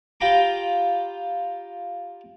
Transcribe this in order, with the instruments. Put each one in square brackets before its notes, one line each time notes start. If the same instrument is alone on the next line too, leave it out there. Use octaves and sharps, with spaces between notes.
[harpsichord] F4 G4 G5 A#5 B5 D6